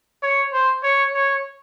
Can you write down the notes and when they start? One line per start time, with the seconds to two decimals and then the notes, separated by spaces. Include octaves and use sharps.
0.22 C#5
0.53 C5
0.83 C#5
1.13 C#5